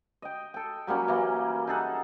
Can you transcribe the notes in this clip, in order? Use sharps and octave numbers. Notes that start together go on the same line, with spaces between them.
D#5 G5
A4 G5
F#3 G3 A#3 C#4
E3 A#3
D#4 G#4 A4 F#5